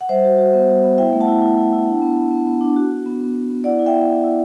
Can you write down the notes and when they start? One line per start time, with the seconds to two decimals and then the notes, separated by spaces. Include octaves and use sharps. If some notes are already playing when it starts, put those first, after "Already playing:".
0.01 F#5
0.09 G3 C5 E5
0.24 F#4
0.38 F#4
0.54 B3
0.68 G3
0.84 B3
0.98 E4 E5 G5
1.13 A3
1.21 F#5 A5
1.27 E4
1.42 E4
1.57 E4
1.73 E4
1.87 D4
2.02 B3
2.16 B3
2.31 B3
2.47 B3
2.61 D4
2.76 F#4
2.91 F#4
3.06 B3
3.20 B3
3.35 B3
3.49 B3
3.64 E4 D5 F#5
3.79 E4
3.86 E5 G5
3.94 B3
4.09 E4
4.24 E4